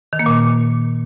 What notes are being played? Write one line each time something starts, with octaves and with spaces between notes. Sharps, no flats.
D#3
A#3
A#2